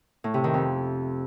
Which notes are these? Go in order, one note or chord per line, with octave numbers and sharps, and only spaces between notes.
A2
C3
D#3
F2